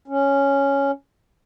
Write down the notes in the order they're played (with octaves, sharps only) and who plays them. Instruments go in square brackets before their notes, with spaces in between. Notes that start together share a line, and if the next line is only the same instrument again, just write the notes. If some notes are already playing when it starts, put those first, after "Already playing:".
[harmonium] C#4